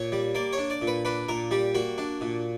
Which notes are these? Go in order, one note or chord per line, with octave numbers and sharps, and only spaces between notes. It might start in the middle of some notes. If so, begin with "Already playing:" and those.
Already playing: A#2 C#5
G3
A#3 D5
C#5
D4
D5
A#2
B4
D4 B4
A#2 A#4
G3 G4
A#3 F#4
D4
A#2